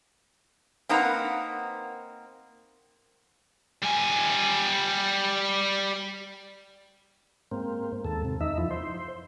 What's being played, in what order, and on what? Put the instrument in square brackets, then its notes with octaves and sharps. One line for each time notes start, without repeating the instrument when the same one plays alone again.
[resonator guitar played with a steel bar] A#3 C4 D#4 B4 F#5 A#5
[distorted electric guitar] G3 G#5
[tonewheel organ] G#2 A#3 C4
D#2 G#2 A4
C3
E2 D#4 E5
F2 F3 E4
C5